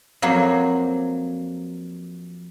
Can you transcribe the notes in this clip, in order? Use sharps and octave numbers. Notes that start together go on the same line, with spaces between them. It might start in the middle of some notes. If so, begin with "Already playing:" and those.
F2 F3 F#3 A#3 C5